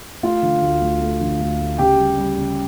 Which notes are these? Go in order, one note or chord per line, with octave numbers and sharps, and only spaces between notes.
A3 F4 F5
D3
D2
D2
A3
D3
D2
A3
C#3 G4 G5
G3
G3
C#3